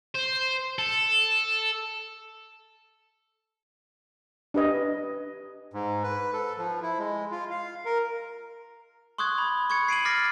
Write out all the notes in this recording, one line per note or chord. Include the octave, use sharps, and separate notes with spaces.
C5
A4
D4 G4 B4 D#5
G#2
B4
A4
F3
E4
G#3
F4
F5
A#4
C6 C#6 D#6 F#6 G#6
B5
C#6 G#6 C#7
C7 D7 D#7 F#7
D6 F6 A6 A#6 C7